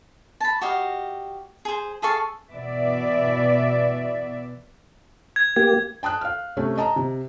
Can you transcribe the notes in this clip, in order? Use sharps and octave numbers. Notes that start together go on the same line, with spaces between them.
A5 B5
F#4 G4 D#5 F5
G#4 C5
G#4 A4 F5 C#6
B2 E3 B3 D5 E5
G#6
A#3 G4 G#6
G5 A5 D#6 F#6
F5 F6
C3 A3 C#4
D#5 A5 A#5
C3